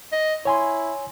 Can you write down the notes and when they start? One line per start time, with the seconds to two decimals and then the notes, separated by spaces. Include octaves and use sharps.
0.12 D#5
0.45 E4 C#5 G#5 C6